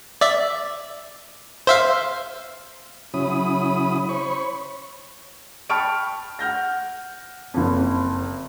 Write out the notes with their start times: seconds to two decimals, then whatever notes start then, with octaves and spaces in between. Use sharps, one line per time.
0.21 D5 E5
1.67 C5 E5 F5
3.14 C#3 F#3 C#4 E4 B5 D#6
4.09 C5 C#5 B5 C#6
5.70 G5 A5 B5 C#6 F6 D7
6.39 F#5 F6 G6 A#6
7.54 F#1 F2